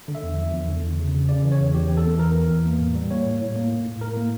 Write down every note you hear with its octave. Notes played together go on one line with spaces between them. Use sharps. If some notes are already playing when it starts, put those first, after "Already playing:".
D3
E5
E2
F3
E2
D3
E2
C#3
C#3
C#3 D5
E3
C#5
E2
E2 G4
E3
A4
E2
E3 A#4
E3
E2
A#3
A2
G3
A#3 C#5
A2
A2
A#3
A2
A2
A2 A#4
A#3